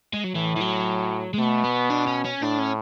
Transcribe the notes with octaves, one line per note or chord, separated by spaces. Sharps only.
G#3
F#3
A2 E3
E3
F#3
G#3
B2 A3
B3
D4
C#4
C#4
A2 D4
C#4